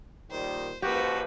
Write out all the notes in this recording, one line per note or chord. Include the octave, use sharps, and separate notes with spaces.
A#2 D#3 G3 C5
C#2 F3 A#3 F#4 G4 B4